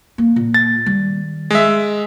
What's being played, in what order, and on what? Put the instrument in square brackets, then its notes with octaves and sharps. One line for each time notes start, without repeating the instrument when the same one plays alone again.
[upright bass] A#3
A#2
[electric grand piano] A6
[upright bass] D#3 G3
[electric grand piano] G#3 E5